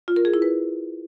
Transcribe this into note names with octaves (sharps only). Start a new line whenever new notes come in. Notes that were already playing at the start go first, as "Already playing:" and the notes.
F4
A#4
G#4
E4
B4